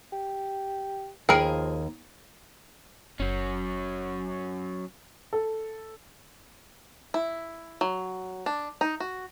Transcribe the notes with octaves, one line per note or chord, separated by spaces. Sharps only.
G4
D#2 F3 G#4 A#4 G5 B5 D7
F#1 F#3 C#4
A4
E4
F#3
D4
D#4
F#4